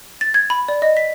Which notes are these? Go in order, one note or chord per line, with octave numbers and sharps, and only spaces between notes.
A6
G#6
B5
D5
D#5
B6